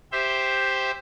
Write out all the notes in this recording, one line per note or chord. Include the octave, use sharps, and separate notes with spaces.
G4 C5 E5 G5